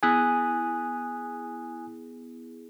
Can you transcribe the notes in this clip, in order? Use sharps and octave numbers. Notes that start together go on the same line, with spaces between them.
B3 E4 G#4 G#5 D#6 F#6